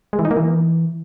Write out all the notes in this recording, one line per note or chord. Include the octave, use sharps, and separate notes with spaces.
G#3
E3
D#4
A#3
E3